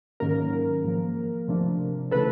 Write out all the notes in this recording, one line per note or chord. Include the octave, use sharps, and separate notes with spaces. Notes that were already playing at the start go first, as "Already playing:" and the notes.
G#2 D#3 F#3 A#3 C#4 A#4
G#2 F3 A#3
C3 F3 A3 D4
C#3 E3 A3 A4 B4